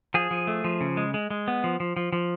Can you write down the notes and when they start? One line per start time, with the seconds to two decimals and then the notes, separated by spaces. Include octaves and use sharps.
0.14 F3 G#4
0.31 F3
0.47 A3
0.64 F3
0.81 C#3
0.97 G#3
1.14 G#3
1.30 G#3
1.48 B3
1.64 F3
1.80 F3
1.97 F3
2.13 F3